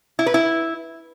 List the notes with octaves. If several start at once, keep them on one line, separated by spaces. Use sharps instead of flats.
E4
B4
E4